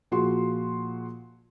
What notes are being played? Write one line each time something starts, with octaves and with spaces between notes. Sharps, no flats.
A#2 F3 F#4 G#4 C6